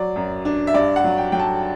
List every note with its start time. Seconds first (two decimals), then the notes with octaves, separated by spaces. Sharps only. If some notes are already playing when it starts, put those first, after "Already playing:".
Already playing: F#3 D5
0.16 F#2
0.45 D4
0.67 E5
0.74 G2 D5
0.96 F#5
1.04 F#3
1.18 G5
1.32 F#3 G5
1.39 A5